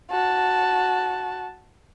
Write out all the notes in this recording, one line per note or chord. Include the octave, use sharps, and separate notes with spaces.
F#4 A5